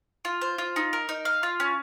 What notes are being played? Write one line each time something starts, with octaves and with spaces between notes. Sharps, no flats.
F4
C5
F4
D#4
A#4
D#4
F5
F4
C#4